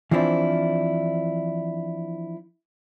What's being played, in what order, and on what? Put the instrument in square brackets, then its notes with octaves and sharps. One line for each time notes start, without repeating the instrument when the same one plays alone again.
[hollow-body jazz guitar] E3 F3 C4 D4 E4